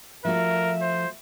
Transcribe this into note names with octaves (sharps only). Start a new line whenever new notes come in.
F3 A3 F#4 A#4 E5
C5